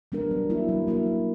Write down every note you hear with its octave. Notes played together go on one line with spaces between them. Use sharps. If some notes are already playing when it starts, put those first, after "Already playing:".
G3 B3 D4 A#4
F#3
A#3 E4 A#4
F#3
A#3 E4 A#4
F#3